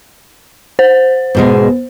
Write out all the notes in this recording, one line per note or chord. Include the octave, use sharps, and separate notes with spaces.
C5
G#2 B2 G#3